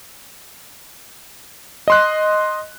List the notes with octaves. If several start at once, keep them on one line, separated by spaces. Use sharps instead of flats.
D#5 C6 F#6